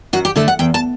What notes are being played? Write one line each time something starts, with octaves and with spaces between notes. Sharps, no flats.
F#2 F#4
G4
D3 A3 A4
F#5
E2 G5
A5